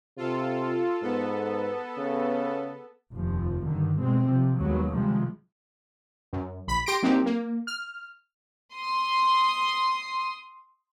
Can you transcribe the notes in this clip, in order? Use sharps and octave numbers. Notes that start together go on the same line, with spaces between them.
C3 F4 A4
G#2 B3 A4
C#3
F1 D#2 F3
G2 D3 D#3
B2 G#3 C4
C3 F3
D#2 F#3 G#3 B3
C3 D#3 F3 G3 G#3
F#2
A#1 B5 B6
G4 C6 A#6 D7
F#3 A#3 C4 D4 D#4 G4
A#3
F6
C6 D#6